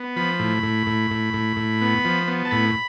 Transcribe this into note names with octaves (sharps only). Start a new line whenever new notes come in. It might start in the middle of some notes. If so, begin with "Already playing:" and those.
Already playing: B3
F3 B5
A2
A2
A2
A2
A2
A2
B3
F3
B3
A5
A2 B5